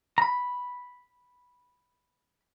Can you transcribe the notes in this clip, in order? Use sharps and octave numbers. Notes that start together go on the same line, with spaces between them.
A#5 B5